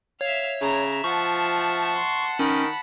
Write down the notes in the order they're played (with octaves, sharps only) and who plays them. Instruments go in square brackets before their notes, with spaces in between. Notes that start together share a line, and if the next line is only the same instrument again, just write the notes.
[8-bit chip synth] C#5 [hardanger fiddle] E5 F5
[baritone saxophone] C#3 [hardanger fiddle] E5 [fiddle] A#5
[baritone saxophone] F3 [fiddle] F#5 A5 [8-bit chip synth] C#6
[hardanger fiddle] C6
[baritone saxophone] D#3 [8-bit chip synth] C#4 [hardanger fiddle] B5